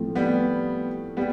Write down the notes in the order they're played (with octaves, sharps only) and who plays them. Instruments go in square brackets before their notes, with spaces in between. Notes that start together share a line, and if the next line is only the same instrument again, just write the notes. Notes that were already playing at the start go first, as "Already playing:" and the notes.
Already playing: [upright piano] A2 F3 A3 C4
[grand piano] G3 B3
[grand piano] G3 B3 [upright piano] G4